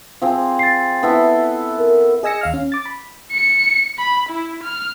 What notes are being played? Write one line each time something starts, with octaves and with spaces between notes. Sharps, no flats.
F3 C4 G#4
A6 C7
B3 E4 A4
A#4
G#4 D#5 G#5 E6 A#6 C#7
D#2 F5 F6
C#4
D6 A6
B5
C#7
B5
E4
F6